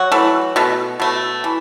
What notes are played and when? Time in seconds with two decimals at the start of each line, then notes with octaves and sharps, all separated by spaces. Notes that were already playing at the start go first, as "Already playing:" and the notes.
Already playing: F#3 F#4
0.12 E3 A3
0.56 B2 A3
1.00 B2 A3
1.44 E3